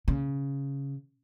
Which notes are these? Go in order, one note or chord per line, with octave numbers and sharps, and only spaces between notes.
C#3